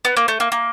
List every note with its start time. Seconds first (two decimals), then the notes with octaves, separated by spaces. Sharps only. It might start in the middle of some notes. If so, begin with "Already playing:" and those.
0.05 B3
0.17 A#3
0.28 A3
0.40 A#3
0.52 A#3